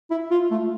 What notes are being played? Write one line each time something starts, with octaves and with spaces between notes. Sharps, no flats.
E4
F4
A3